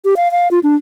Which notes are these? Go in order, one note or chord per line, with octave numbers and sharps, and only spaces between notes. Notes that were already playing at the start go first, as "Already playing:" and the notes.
G4
F5
F5
F4
D4